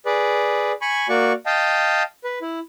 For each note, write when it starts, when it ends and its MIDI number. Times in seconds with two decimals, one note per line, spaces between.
0.06 0.72 68
0.06 0.72 71
0.06 0.72 74
0.82 1.07 80
0.82 1.07 83
0.82 1.07 85
1.09 1.33 58
1.09 1.33 66
1.09 1.33 74
1.09 1.33 85
1.46 2.03 75
1.46 2.03 77
1.46 2.03 79
1.46 2.03 81
2.24 2.39 71
2.42 2.59 64